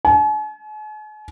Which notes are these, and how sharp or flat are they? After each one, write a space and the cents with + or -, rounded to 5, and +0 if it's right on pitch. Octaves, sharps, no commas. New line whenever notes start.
G#5 +45